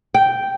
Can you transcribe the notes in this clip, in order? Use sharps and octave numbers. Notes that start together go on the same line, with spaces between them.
G5